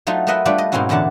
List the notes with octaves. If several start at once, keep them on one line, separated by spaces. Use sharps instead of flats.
F#3 A3 D#4 F4
A3 A#4 B4 D#5 E5 F#5
G3 A3 D4 F4 B4 D5
D#5
G#2 B2 C4 C#4 E4 F#4
E2 A#2 D3 A3 F#5 A5